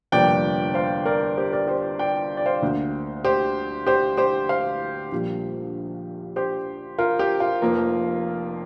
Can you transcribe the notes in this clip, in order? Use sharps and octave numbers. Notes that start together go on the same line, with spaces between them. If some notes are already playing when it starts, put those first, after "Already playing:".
G1 F2 C3 A#3 D5 G5
C5 F5
A#4 D5
G4 C5
A#4 D5
G4 C5
D5 G5
D5
C5 F5
D2 D3 A#3
G4 C5
G4 C5
G4 C5
C5 F5
A#1 A#2 G3
G4 C5
F4 A#4
G4
F4
F1 F2 F3 A#3